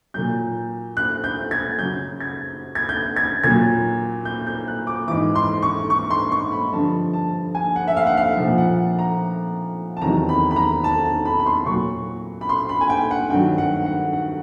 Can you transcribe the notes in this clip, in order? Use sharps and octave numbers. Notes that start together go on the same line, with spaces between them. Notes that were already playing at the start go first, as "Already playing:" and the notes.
A#2 F#3 G6
F#6
G6
G#6
F#2 C#3 F#3 G6
G#6
G#6
G6
G#6
A#2 F#3 G#6
G6
G6
F#6
D6
G#2 E3 D6
C6
C#6
C#6
C6
C#6
B5
G2 D3 F3 A5
A5
G#5
F#5
E5
F5
F#5
F5
A#2 F3
F#5
A#5
A5
E2 C3 D#3 F#3 A#5
B5
B5
A#5
A5
A5
B5
B5
C6
A#2 F#3 C#6
B5
C6
B5
G#5
G5
F#5
G2 D#3 F#3 G5
F#5
F#5
F#5